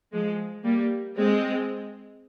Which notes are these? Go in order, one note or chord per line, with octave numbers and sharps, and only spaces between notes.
F3 G#3
G3 A#3
G#3 C4